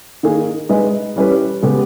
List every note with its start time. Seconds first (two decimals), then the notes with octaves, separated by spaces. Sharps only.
0.23 D#3 A#3 D#4 G#4
0.69 G#3 D#4 G#4 B4 D#5
1.16 E3 G3 C#4 G4 B4
1.62 C#3 G#3 B3 G4